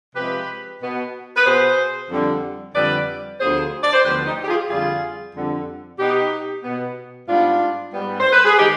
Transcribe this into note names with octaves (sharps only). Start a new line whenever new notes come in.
C3 F3 G#3 G4 B4
B2 B3
B4
B2 B3 G#4 C5
F2 D3 G3
F2 D3 G3 B4 D5
D2 D3 F3 B3 G#4 C5
D5
C5
D2 D3 F3 B3 G4 B4
D#4 G4
G4
F4 G#4
F2 D3 G3 F4 G#4
F2 D3 G3
B2 B3 D#4 G4
B2 B3
G#2 G3 B3 D4 F4
G#2 G3 B3
C5
B4
G#4
D#3 G#3 D#4 G4